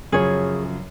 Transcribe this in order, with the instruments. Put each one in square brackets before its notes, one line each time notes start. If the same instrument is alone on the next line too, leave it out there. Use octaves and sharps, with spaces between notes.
[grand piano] F#2 C#3 F3 [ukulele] G#4 C#5